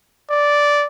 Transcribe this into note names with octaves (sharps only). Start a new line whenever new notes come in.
D5